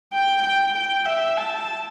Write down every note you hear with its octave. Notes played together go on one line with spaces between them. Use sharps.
G5
G5
G5
E5
A5